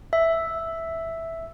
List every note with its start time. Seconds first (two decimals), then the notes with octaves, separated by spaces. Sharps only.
0.13 E5